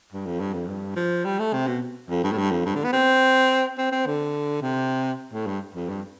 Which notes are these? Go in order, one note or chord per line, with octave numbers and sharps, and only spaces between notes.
G2
F2
G2
F2
G2
F3
G3
A3
C3
B2
F2
G2
A2
G2
F2
G2
D3
B3
C4
C4
C4
D3
C3
A2
G2
F2
G2